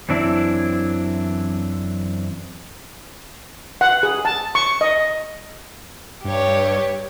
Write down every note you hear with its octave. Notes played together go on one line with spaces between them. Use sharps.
F#2 E3 C4 D4 E4
F#5
G#4
A5
C#6
D#5
G2 G4 C#5